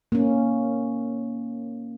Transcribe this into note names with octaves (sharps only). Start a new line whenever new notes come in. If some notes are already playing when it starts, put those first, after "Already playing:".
A#3 C#4